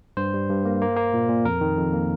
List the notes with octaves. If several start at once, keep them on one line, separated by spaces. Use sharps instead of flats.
G2 C5
G3
G2
A#3
A#3
A#3
A#2
A#2
F2 A#4
D#3
F2
A#3